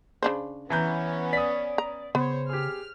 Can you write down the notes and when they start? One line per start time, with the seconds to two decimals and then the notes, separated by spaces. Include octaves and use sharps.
0.23 C#3 D4 C5
0.70 E3 B3 C#4 A#5 G6
1.33 D5 D#6 B6
1.78 A#5
2.15 C#3 B3 C5 C#5
2.49 G4 G#4 F6